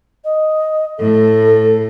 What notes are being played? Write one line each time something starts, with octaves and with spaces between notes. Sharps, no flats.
D#5
A2 A4